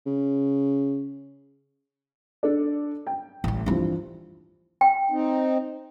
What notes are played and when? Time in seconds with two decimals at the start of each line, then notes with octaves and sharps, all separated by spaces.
0.06 C#3
2.43 D4 A4 D5
3.07 G5
3.44 A1 G3
3.66 G2 E3 F3 C4 C#4
4.81 G5
5.11 C4 D#4